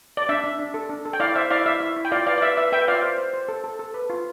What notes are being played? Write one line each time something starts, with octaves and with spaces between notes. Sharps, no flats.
D5
D4 E5
D4
D4
A4
D4
A4
G5
E4 D5 F5
C5 E5
E4 D5 F5
E4 E5
E4
E4
G5
F4 D5 F5
B4 D5 F5
D5
B4 E5
B4 E5
B4 E5 G5
F4 D5 F5
C5
C5
C5
A4
A4
A4
B4
F4